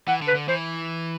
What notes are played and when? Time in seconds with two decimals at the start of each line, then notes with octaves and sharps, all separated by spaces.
0.08 E3 F#5
0.22 D3
0.28 B4
0.35 D3
0.48 E3 C5